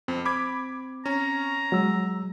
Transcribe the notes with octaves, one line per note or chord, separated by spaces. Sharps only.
F2 C4
B5 D6 G#6
C#4 A#5
F#3 G#3 E6